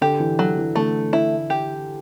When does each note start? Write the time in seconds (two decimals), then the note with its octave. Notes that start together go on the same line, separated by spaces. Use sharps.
0.01 D3 G4
0.20 E3
0.39 D3 F#3
0.57 E3
0.75 D3 A3
1.13 E4
1.50 G4